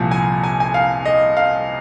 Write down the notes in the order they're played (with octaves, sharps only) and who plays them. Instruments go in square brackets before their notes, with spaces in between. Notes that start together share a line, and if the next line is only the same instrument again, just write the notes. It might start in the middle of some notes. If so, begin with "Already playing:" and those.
Already playing: [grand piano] C2 A#2 F3
G#5
G#5
G#5
F5
D#5
F5